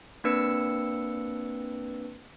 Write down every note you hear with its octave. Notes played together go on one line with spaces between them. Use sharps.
A#3 C4 D4 B4 E6 C#7